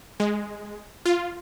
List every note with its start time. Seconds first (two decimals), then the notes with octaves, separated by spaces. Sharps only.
0.20 G#3
1.05 F4